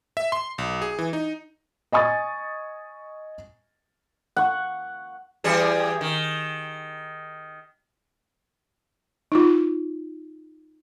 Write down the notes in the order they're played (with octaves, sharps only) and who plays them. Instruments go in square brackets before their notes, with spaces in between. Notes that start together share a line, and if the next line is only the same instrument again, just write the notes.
[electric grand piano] E5
C6
B1
G#4
E3
D#4
[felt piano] D#5 G#5 C#6 D#6 A6
[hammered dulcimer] F#5 C#6
[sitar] E3 G3 G#4
D#3
[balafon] D#4 F4